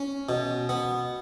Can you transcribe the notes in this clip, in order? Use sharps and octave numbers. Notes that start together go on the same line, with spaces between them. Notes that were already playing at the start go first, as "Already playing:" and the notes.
Already playing: C#4
B2
B3